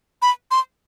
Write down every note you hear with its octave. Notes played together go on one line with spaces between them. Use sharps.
B5
C6